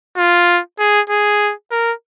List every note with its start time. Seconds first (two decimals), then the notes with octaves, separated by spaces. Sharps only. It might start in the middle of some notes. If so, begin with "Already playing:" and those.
0.17 F4
0.79 G#4
1.10 G#4
1.71 A#4